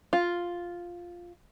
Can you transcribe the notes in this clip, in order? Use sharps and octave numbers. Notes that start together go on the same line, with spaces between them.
F4